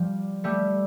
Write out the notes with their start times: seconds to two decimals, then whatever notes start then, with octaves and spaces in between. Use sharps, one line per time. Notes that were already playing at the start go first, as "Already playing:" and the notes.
Already playing: F3 G3
0.44 G3 A3